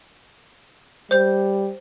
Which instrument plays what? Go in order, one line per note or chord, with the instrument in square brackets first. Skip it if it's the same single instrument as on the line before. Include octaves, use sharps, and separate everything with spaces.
[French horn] G3 [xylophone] C5 G6